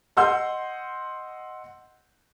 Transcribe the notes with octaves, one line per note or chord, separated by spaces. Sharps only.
D#5 F#5 C6 E6 G6